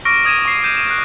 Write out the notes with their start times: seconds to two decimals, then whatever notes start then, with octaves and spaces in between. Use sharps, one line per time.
0.05 C#6 D6 F6 A#6 D7
0.25 D#6 G#6 D#7 E7
0.45 C#6 C7
0.64 G6 E7
0.76 E7
0.89 F#6 C7